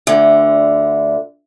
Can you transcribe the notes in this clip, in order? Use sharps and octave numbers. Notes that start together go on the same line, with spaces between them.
D2 D3